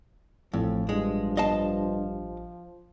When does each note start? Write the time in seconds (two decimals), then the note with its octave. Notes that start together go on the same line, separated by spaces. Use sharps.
0.54 A1 F2 A2 F3
0.89 G2 G#3
1.37 D#5 F5 A5